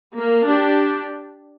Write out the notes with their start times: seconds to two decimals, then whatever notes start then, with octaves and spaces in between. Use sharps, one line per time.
0.17 A#3
0.47 D4 G4